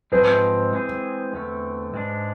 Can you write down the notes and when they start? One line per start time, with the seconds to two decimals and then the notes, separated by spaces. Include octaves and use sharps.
0.12 G#2 F3 G#3 C4 G#4 B4
0.73 E3 G#3 C4 G#4
1.33 E2 D3 A3 C4
1.94 G#2 G#3 D4